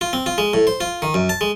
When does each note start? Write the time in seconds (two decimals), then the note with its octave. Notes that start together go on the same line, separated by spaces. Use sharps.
0.01 F4
0.13 C4
0.26 F4
0.38 G#3
0.54 A2
0.67 C5
0.81 F4
1.02 D#3
1.14 F#2
1.29 A5
1.41 G#3